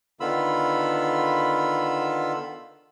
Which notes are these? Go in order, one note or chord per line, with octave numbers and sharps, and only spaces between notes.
D3 D#3 B3 F4 B5 E6